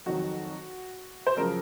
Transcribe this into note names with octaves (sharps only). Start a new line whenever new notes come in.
F2 D#3 F#3 F#4
C5
F#2 C#3 F3 A#4